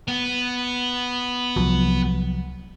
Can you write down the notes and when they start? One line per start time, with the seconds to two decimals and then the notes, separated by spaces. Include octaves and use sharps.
0.08 B3
1.56 C2 F3 F#3